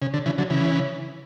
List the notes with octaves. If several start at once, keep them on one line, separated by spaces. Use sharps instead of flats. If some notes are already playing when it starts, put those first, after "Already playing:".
C#3
D3
C#3 E3
D3 F#3
C#3 E3